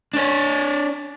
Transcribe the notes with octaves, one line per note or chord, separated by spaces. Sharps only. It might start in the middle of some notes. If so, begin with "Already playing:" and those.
D4 C#5